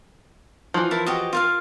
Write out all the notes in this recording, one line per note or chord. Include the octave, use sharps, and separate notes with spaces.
E3 F3
E4 A#4 A5
F#4 G4 D#5
F4 A#4 F5